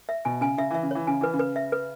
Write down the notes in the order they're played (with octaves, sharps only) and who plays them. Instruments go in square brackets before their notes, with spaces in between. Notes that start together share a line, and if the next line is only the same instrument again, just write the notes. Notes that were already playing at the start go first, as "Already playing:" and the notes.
[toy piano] E5
[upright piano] B2 [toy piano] G#5
[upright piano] C#3 [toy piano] G#5
[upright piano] C#3 [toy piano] E5
[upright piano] E3 [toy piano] E5
[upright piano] C#3
[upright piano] E3 [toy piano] C#5
[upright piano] C#3 [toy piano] G#5
[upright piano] E3 [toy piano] B4
[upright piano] C#3
[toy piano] B4
E5
B4